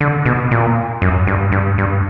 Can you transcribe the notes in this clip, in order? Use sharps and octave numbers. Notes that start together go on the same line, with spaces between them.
D3
B2
A#2
F#2
G2
G2
G2